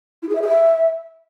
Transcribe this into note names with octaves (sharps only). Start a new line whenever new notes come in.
E4
G#4
E5
G#4
E5